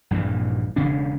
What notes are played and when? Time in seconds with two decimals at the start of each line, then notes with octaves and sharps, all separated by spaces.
0.11 A#1 G2 A#2 E3
0.76 E1 C#3 C#4 D4